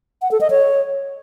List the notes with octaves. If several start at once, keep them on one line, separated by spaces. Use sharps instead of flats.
F#5
A4
D#5
C#5